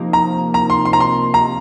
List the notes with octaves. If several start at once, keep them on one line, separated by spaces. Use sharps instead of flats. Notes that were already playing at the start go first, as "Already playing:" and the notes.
Already playing: C3 F3 A#3 D#4
A#5
A#5
C6
C6
A#5
C6
A#5